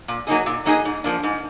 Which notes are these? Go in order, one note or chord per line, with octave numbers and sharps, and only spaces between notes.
A#2
F#3 A#3 D#4 G#4
A#2
F#3 A#3 D#4 G#4
G#2
F3 A#3 D4
G#2